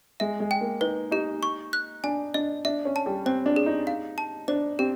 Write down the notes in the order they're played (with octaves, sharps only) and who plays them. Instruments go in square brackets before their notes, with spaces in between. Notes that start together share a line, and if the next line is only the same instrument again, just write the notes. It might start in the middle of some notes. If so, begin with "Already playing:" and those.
[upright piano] G#3 [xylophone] E5
[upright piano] G#3
[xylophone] G5
[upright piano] A#3
[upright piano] D#4 [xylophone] B4
[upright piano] D#4 [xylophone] G4
[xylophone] C#6
F#6
[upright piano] D4 [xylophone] G#5
[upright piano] D4 [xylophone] D#5
[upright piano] D4 [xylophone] E5
[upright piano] C#4
[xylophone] A5
[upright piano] G3
[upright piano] C4 [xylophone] C5
[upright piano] D4
[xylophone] G#4
[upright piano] D#4
[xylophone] F5
A5
[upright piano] D4 [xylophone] C5
[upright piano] C4 [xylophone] G4